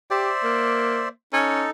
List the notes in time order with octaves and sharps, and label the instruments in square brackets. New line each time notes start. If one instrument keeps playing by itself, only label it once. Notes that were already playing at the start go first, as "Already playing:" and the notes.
[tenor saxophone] G4 [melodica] C5 D5 E5
[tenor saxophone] A#3
[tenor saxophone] C#4 [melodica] D#4 A4